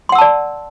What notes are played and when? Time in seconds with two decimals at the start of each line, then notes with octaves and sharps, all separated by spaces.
0.09 C6
0.12 F#5
0.15 E6
0.18 A5
0.21 D5